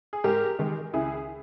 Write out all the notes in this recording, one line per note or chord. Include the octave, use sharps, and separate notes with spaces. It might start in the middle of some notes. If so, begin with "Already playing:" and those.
G#4
G#2 G4 A#4
D#3 G#3
C#2 E4 G#4